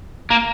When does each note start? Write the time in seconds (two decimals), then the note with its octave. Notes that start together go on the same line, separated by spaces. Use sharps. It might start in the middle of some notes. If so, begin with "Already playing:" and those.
0.30 A#3